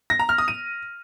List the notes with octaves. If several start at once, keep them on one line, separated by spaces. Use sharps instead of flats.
A#6
A#5
F6
D#6
D#7